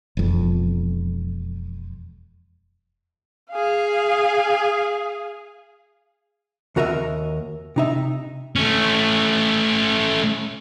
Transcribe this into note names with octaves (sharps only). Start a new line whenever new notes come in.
E1 F2
G#4 F5
D#2 F#4 A#4 D#5 E5
C3 D#4 E5
A3 C#4